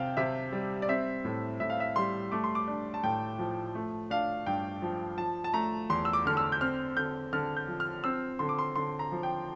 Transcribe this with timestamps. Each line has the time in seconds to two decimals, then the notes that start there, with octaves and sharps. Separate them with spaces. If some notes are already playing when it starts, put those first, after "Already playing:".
Already playing: C3 C4 F5 G5 A5
0.17 C3 E5
0.52 G3
0.82 D5
0.88 C4 E5
1.25 A2
1.60 A2 E5
1.70 F5
1.80 E5
1.96 G3 C6
2.32 A3 D6
2.44 C6
2.55 D6
2.68 D4
2.94 A5
3.04 A2 G5
3.39 F3
3.75 A3
4.10 D4 F5
4.46 G2 G5
4.82 F3
5.17 F3 A5
5.44 A5
5.53 A3 A#5
5.90 E2 C6
6.05 E6
6.13 D6
6.26 D3 F6
6.37 E6
6.52 G6
6.61 C4 F6
6.97 D3 G6
7.33 D3 F6
7.57 G6
7.68 F3
7.80 F6
8.04 C4 E6
8.39 D3 C6
8.49 D6
8.59 C6
8.76 D3 C6
8.99 A#5
9.12 F3
9.23 G5